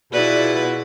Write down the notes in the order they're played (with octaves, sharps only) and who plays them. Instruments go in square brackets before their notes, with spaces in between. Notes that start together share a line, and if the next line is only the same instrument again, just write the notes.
[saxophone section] B2 [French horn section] B3 F4 G#4 [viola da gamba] E4 B4 [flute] D5